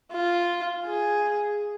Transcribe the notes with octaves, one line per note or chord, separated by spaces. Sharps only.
F4
G#4